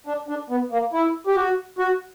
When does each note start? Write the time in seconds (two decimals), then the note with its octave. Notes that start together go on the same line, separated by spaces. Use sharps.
0.07 D4
0.28 D4
0.50 B3
0.71 A#3
0.93 E4
1.27 G4
1.36 F#4
1.79 F#4